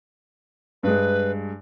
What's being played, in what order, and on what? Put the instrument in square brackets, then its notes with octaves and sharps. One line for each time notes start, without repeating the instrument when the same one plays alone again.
[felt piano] G2 G#3 [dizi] B4